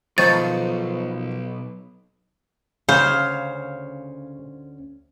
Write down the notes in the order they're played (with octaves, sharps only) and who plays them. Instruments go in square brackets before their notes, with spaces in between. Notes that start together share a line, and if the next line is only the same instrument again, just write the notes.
[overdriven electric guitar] B1 [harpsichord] D#3 F3 C#6 [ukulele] D#4 C5 F5 [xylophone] A6
[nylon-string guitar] D2 C#4 E5 [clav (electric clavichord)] C#3 [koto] C5 [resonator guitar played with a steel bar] F5